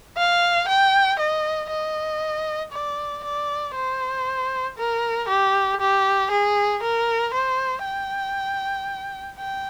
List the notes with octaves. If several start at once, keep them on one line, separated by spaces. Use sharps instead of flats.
F5
G5
D#5
D#5
D5
D5
C5
A#4
G4
G4
G#4
A#4
C5
G5
G5